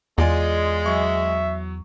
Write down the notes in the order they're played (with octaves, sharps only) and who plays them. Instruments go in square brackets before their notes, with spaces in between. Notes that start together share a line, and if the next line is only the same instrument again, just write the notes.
[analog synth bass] E2 [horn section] G#3 [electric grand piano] F4 D5 G#5
[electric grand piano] F#3 C#6 [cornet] E5